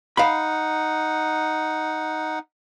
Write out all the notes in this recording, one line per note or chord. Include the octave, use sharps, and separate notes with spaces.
D#4 F5 F#5 B5